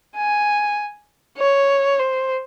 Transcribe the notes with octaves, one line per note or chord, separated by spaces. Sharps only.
G#5
C#5
C5